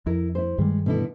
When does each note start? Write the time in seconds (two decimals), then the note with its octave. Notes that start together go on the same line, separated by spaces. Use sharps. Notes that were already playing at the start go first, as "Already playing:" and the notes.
0.06 F2 E4 A#4
0.35 E4 C5
0.58 G2 D#3 G3 G#3
0.86 B2 D3 E4